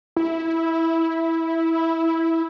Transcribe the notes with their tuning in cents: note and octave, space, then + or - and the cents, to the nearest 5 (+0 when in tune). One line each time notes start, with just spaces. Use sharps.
E4 -10